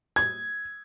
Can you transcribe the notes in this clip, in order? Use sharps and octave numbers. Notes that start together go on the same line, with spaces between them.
G#6